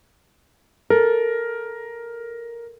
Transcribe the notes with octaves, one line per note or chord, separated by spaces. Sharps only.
A4 A#4